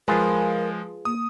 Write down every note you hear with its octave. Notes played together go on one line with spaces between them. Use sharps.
F3 G#3 F4 G#4 A#4 B4
A#3 D#6